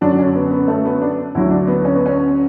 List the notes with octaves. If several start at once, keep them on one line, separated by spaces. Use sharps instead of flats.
F#2 D3 F#3 D4
C#4
B3
B3
A3
B3
D4
D2 D3 F#3 E4
D4
B3
C#4
B3
C#4